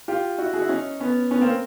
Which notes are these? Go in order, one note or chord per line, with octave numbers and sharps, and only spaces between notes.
F4 G4
E4 F#4
F#4 G#4
E4
C#4 D#4
B3 C#4
B3 C#4
A#3 C4